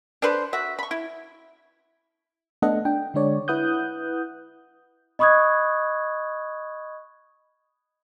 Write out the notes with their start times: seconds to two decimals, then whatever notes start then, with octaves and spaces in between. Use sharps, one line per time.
0.22 D4 A4 B4 C5
0.53 F#4 E5
0.79 B5 C#6
0.91 E4
2.62 A3 B3 D4 A4 D#5 F#5
2.85 D4 G5
3.14 D3 G#3 D4 C#5 D5
3.48 E4 B4 F#5 D#6 F#6 G6
5.19 D#5 B5 C#6 D#6 F#6 G#6